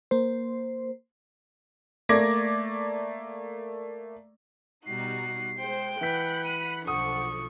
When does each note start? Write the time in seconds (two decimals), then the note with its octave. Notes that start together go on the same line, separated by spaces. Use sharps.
0.11 A#3 C5
2.09 A3 A#3 D5 D6 G#6 A#6
4.86 B2 G3 D#4 F#4 C7
5.59 G#3 C5 G5
6.01 E3 F#5 B5 G6 B6
6.44 D#7
6.87 B1 D3 F3 F#5 C#6 D#6